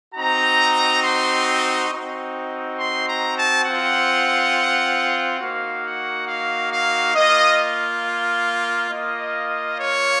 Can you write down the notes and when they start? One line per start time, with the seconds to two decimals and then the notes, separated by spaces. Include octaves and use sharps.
0.15 C4 D#4 F#4 A#5
1.03 C6
1.47 C6
1.90 C4 D#4 F#4
2.77 C6
3.07 A#5
3.36 A5
3.65 C4 F4 F#5
5.40 A#3 D#4 F#4 F5
5.84 F#5
6.27 F5
6.71 F5
7.14 A#3 F4 D#5
8.90 A#3 F4 D#5
9.78 C#5